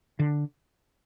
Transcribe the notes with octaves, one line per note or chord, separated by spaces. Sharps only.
D3